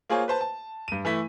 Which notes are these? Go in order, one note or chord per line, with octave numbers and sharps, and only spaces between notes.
A#3 F4 G#4 C5 C#5 G#5
B4 C5 A5
A5
G2 D#7
E3 A3 E4 B6